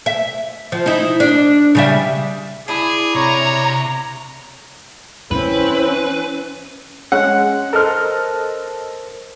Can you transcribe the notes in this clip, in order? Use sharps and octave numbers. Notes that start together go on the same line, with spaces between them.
E5
F3
D#4 E4
D4
C#3 G3 E5
D4 E4 G#4
C3 C#5 A#5
E3 C4 C#4 E4 B4
G#3 C#4 F#5
A4 A#4 C5 D#5 F6